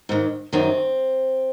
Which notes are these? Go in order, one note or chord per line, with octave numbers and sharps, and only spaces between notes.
G#2 D#3
F#2 D#3 C4